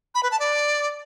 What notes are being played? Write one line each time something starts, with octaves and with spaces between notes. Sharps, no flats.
B5
B4
A5
D5